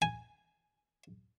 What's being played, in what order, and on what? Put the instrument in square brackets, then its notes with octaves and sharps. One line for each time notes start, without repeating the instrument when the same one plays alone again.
[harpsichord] G#5